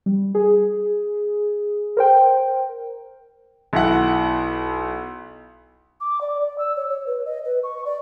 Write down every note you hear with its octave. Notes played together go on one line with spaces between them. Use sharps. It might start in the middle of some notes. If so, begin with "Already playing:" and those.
G3
G#4
A#4 C5 G5
B1 E4 F#5
D6
D5
D5
E6
C#5
C#5
B4
D#5
B4
C#6
D5